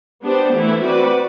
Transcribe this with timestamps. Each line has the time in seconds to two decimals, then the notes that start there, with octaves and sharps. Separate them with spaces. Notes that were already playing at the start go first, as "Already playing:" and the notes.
0.22 B3 D4 G4 C5
0.53 E3 A3 E4
0.83 C4 F#4 B4 D5